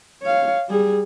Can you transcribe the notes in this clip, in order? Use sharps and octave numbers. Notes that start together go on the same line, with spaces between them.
C#5 F5
G3 G#4